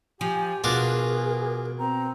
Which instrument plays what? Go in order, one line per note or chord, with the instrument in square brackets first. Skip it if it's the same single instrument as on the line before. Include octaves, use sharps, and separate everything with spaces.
[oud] F3 [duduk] G4 [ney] G#5
[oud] B2 [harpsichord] D4 F4 F#4 [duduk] G#4 [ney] A#4
[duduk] C4 [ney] A#5